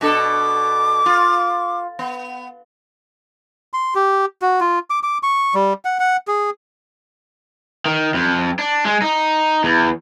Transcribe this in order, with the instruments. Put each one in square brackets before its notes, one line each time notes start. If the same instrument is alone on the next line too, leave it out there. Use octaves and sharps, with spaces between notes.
[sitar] B2 D4 A4 [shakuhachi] D6
[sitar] F4
B3
[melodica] C6
G4
F#4
F4
D6
D6
C#6
G3
F#5
F#5
G#4
[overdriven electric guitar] D#3
F2
D4
G#3
D#4
E2